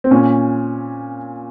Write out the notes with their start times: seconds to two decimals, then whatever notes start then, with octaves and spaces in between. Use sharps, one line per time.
0.04 C4
0.11 A#2 C#4